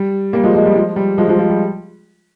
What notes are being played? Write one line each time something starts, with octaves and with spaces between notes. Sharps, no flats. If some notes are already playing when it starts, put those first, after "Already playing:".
Already playing: G3
G3 A#3
F3 G#3
F3 G#3
G3
F3 G#3
G3
F3 G#3
F3 G#3
F3
G3